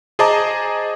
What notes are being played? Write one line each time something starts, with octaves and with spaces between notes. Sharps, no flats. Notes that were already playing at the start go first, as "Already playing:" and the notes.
G#4 C5 D#5 A5 A#5 D6